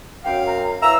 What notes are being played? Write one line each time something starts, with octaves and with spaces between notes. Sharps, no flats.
F#2 F5 G5
A#5
E3 C#4 F5 A#5 E6